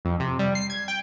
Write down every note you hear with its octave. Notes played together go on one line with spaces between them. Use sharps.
F2
C3
G3
C7
G#6
G5